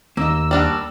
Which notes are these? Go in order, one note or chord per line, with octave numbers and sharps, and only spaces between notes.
D#2 A#3 D#5 E6
G3 D4 F#4